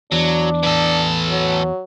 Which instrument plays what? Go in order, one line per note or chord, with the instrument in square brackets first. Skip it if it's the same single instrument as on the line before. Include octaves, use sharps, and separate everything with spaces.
[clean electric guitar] E2 [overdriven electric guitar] F#3 [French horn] D4
[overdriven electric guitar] E3 A4
[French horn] F#3